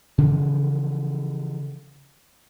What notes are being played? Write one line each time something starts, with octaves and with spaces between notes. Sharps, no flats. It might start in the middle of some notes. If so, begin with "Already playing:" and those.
C#3 E3 F3